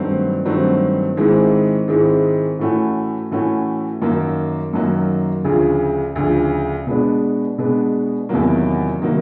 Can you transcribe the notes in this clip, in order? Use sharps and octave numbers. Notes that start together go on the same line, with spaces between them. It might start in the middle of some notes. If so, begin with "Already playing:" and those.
Already playing: G2 D#3 F#3 A3 C4
G2 D#3 F#3 A3 C4
G#2 D#3 G#3 C4 E4
G#2 D#3 G#3 C4 E4
A2 E3 A3 C#4 F#4
A2 E3 A3 C#4 F#4
F#2 D#3 F#3 A#3
F#2 D#3 F#3 A#3
D2 C#3 F3
D2 C#3 F3
B2 G#3 B3 D4
B2 G#3 B3 D4
E2 C3 D#3 F#3 A#3
C3 D#3 F#3 A#3